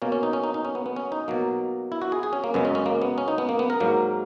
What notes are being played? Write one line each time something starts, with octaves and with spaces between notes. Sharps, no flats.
B2 A#3 C#4
C#4
D#4
C#4
D#4
D#4
C#4
B3
B3
C#4
D#4
B2 F#3 A#3
E4
F#4
G#4
G#4
C#4
A#3
F#2 C#3 G#3 B3
C#4
C#4
A#3
B3
C#4
D#4
B3
A#3
B3
A#4
G#2 F#3 A#3